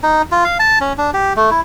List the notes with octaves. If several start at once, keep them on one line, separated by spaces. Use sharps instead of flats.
D#4
F4
F5
A5
C#4
D4
G4
A3
E4